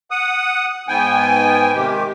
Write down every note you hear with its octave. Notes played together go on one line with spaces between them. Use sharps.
F#5 D#6
G#2 B3 G5 G#5
C3 D#3 G#3 G4